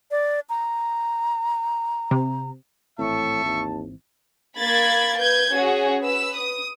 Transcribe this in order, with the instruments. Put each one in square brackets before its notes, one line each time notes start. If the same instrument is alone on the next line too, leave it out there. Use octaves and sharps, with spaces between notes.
[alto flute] D5
A#5
[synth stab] C3
[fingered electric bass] G#1 E3 C4 [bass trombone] A2 [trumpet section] E5 C#6 [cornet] A5
[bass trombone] D#2
[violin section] A#3 B5 G#6 A6
B4 G6 G#6
C#4 F#4 G#4
B4 E6
D#6